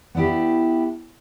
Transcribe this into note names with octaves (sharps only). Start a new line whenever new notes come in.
B3 D4 E4 G4